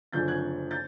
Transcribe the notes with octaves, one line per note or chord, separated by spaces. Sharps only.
F#1 F#2 D3 F3 G6 A6
F#6 G#6
G6 A6